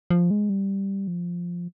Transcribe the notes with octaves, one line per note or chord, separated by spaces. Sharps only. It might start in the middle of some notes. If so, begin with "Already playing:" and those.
F3
G#3
G3
F3